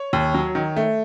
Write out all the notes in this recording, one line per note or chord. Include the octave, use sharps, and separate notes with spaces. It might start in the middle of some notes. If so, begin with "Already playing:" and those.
Already playing: C#5
D#2
F#3
D#3
A3